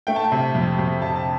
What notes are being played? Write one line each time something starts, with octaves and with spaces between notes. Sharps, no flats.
A3 G5
A5
G5
C3
F2
F2
C3 A5
A5